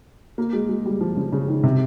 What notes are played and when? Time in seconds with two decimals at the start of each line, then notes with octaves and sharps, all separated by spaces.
0.38 A#3
0.53 G#3
0.69 G#3
0.86 G3
1.01 F3
1.17 C#3
1.32 C#3
1.48 D#3
1.63 C3